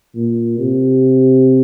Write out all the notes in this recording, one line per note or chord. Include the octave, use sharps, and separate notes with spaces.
A#2
C3